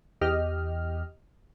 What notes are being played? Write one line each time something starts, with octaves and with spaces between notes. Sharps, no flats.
E2 G4 D#5 F6